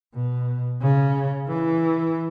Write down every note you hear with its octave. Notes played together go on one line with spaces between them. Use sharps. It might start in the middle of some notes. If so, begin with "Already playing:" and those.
B2
C#3
E3